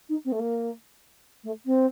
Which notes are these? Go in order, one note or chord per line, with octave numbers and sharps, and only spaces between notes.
D#4
C4
A3
A#3
A3
C4